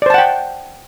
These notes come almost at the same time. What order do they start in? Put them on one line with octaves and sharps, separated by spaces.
D5 C5 A5 F#5 G5